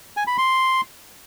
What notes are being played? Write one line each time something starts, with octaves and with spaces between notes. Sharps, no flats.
G#5
B5
C6